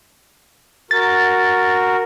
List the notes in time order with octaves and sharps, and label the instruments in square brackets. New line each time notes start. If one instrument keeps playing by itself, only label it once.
[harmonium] F#4 A#4 [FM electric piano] A6